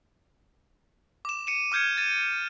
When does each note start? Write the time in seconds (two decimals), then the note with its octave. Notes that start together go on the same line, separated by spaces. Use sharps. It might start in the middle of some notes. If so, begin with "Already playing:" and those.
1.25 D6 E7
1.47 C#7 D#7 E7
1.72 D6 F6 G6 G#6 C#7
1.97 A6 D#7